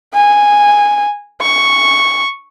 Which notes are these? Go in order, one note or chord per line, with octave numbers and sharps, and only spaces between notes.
G#5
C#6